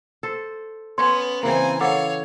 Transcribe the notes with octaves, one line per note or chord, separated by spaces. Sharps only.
A4 C5
B3 C#4 C#5 C6
C#3 E3 A#3 C4 G#5
A4 C#5 F5 F#5 D6